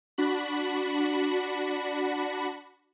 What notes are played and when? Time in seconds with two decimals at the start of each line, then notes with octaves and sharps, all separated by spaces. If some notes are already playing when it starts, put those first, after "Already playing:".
0.18 D4 F#4 B5